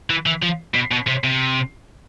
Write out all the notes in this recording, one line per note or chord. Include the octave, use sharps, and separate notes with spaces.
E3
E3
F3
B2
B2
C3
C3